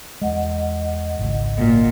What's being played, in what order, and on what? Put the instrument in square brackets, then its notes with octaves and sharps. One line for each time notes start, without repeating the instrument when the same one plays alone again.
[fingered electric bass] E2 G#3 [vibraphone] D#5 F#5
[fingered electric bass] G#1 C#2
[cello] A#2